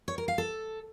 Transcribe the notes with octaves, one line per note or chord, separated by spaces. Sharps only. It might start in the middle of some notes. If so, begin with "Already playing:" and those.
C#5
A#4
F5
A4